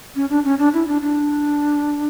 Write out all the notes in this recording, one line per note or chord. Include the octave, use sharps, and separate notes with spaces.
C#4
D4
C#4
D4
E4
D4
D4